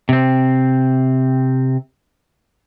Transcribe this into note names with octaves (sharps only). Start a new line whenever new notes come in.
C3 C4